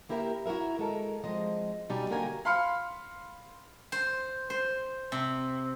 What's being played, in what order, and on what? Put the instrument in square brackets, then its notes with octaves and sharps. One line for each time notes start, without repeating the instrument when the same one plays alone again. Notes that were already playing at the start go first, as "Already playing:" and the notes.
[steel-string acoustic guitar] A#3 E4 G4 A#4 B4 E5
E4 F#4 G#4 A#4 E5
G#3 A4 A#4
F3 G#3 C4 D#5
B2 G3 D#4 D5 G#5
D3 A#3 F#4 G4 A#4 G#5
[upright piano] F5 B5 C6 F6 C#7
[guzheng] C5
C5
C3